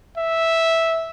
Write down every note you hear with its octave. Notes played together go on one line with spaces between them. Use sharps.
E5